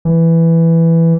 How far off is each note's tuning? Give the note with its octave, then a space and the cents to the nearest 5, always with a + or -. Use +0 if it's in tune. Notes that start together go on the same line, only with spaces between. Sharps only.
E3 +5